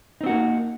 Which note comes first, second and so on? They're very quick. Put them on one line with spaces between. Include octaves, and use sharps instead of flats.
D#4 C4 F#4 A#3